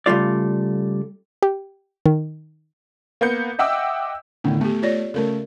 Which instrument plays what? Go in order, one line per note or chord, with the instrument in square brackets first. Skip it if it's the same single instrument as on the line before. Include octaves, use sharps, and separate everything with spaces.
[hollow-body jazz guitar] C#3 G3 A3 F4 D5
[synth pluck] G4
D#3
[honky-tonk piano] A#3 B3 G6 C#7
D#5 E5 F#5 G5 D6 E6
[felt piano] A2 D3 D#3 [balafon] B3
[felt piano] A3 [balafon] B3 G4
[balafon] F4 C#5 D5
[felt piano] C#3 A3 [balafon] A4 A#4